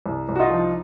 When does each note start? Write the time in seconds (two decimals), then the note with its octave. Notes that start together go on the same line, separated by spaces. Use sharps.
0.06 C2
0.29 C2
0.35 F#4
0.39 D#4 F4
0.50 F3